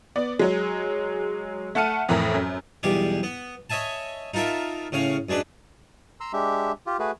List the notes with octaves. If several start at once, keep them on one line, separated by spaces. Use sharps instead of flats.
B3 D5
F#3 G#3
A3 F#5 A5 F6 C#7 D#7
F2 A2 E3 A#4
F#2
B1 E2 G3 G4 G#4
B3
C#5 D#5 E5 G#5 A5
D#4 F4 A4 A#4 E5
A2 C#3 C#4 F5
F#2 G#3 D4 B4
A#5 C6 E6
G#3 D4 G4 E5
F4 G4
A3 F#4 G#4 B4